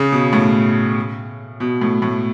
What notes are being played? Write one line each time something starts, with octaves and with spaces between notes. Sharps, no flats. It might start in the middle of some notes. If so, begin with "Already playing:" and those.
Already playing: C#3
B2
A2
B2
A2
A2